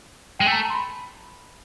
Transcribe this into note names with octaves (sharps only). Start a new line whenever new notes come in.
G#3 G5
A3 G#5
A#5
A5
A#5
C6
B5